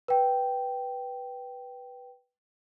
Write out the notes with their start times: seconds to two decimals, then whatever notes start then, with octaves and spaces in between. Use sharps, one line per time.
0.08 B4 G5